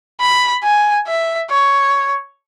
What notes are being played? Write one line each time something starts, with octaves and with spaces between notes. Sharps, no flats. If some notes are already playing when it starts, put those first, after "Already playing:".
B5
G#5
E5
C#5